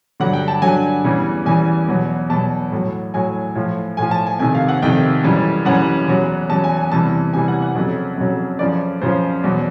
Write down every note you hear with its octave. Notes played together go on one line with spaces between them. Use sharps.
G2 D3 F#3 F#5
G5
A5
G2 D3 F#3 G#5
E2 C#3 E3 G3
E2 C#3 E3 G3 G#5
E2 B2 F#3
E2 B2 F#3 A5
A2 F#3
A2 F#3 G#5
A2 F3
A2 F3 G#5
A5
G#5
F2 C3 D#3 G#5
F5
F#5
F2 C3 D#3 G5
F#2 C#3 E3 G3
F#2 C#3 E3 G3 F#5
E2 C#3 F#3
E2 C#3 F#3 A5
G#5
G#5
E2 C3 E3 G3 A5
E2 C3 E3 G3 G#5
F#5
F#5
F2 C#3 F#3
F2 C#3 F#3
F#2 C#3 F3 D5
F#2 C#3 F3 C5
E2 B2 F#3